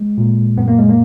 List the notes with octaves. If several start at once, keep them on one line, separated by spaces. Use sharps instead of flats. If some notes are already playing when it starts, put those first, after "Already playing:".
Already playing: G#3
A#2
F#2 B3
A#3
G#3
A#3